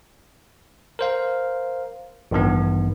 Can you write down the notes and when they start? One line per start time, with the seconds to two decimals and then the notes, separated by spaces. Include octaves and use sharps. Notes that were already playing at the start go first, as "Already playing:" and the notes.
0.99 A#4 C5 F5
2.31 A1 G2 D#3 B3